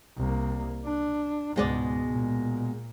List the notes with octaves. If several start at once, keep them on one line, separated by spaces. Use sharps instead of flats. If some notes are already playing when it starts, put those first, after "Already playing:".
C2 A#3
D4
C#2 G#2 B2 G#3 D5
A#2